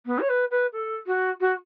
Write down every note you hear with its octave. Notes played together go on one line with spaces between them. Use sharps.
B3
C#5
B4
B4
A4
F#4
F#4